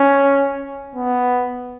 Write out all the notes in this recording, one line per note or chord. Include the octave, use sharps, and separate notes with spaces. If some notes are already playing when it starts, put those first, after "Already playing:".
Already playing: C#4
B3